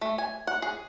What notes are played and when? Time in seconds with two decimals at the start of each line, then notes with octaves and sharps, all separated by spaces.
0.01 A3
0.18 G#5
0.47 F#5
0.62 G#4